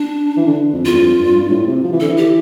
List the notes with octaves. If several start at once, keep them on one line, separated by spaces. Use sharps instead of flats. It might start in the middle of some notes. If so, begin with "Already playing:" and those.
Already playing: D4
E3
D3
F2
E2 F4
G2
F2
G2
G2
A2
C3
F3
E3
D3 A4
E3
G4